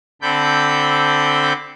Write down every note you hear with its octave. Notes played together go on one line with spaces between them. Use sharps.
D3 C4 A4 B5 D6 G6